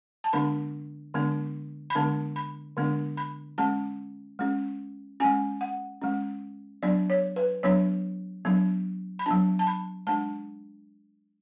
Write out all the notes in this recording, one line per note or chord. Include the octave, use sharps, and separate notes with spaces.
A5
D3 G#3 B3 D4 B5
D3 G#3 B3 D4
B5
D3 G#3 B3 D4 A5
B5
D3 G#3 B3 D4
B5
G#3 C#4 A5
G#3 C#4
G#3 C#4 G#5
F#5
G#3 C#4
F#3 B3 D4 D5
C#5
B4
F#3 B3 D4 C#5
F#3 B3 D4
B5
F#3 B3 D4 A5
A5
B5
G#3 D4 A5